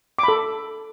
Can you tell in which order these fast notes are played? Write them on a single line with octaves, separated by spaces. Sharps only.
D6 B5 A4